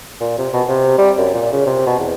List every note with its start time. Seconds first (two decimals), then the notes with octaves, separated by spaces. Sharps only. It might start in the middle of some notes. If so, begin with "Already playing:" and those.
0.21 A#2
0.38 C3
0.54 B2
0.69 C3
0.98 G3
1.18 F#2
1.34 A#2
1.53 C#3
1.66 C3
1.86 B2
1.99 E2